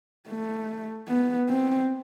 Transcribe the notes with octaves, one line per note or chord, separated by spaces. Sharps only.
A3
B3
C4